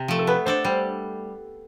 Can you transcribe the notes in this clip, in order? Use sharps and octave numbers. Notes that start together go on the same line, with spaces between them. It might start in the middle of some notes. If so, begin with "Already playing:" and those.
Already playing: C3
F3 A3
A4
B3 B4
D4 A4 C5 D5
G3 C5